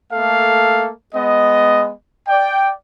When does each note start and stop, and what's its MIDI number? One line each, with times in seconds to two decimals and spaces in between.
0.13 0.91 57
0.13 0.91 58
0.13 0.91 69
0.13 0.91 77
1.14 1.93 56
1.14 1.93 59
1.14 1.93 75
2.28 2.72 74
2.28 2.72 79